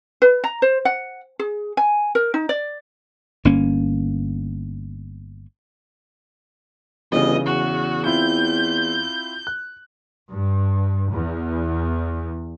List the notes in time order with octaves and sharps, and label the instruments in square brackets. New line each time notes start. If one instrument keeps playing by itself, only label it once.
[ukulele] B4
A#5
C5
F#5
G#4
G#5
A#4
D#4
D5
[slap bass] G1 A#3 C#4
[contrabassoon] G1 [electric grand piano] C#3 E3 [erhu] D#5
[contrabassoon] E2 [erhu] F#4
[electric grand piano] C4 E4 F4 [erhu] G6
[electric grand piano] F#6
[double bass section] G2
E2